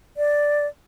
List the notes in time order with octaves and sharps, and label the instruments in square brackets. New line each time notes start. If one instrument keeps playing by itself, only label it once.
[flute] D5